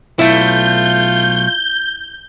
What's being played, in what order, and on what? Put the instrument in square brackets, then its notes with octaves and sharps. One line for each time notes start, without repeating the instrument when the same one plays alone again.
[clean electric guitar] B1 A3 [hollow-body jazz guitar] E4 [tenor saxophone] F4 [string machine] G6